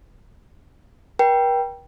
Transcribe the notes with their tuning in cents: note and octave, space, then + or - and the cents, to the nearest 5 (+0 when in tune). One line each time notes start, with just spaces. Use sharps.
A#4 +45 G5 +0